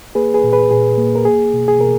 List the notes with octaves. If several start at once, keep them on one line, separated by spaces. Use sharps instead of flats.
A#3 G#4 B4
G#4 B4
A#2
G#4 B4
A#2 G#4
A#3
A#4
A#3 G#4
B2
G#4
B2 A#4